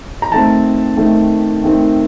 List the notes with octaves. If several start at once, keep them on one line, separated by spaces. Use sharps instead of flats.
A#5
D#3 A3 C4 A5
D#3 A3 C4
D#3 A3 C4